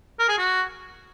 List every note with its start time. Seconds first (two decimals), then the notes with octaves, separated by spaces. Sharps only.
0.19 A#4
0.29 G#4
0.38 F#4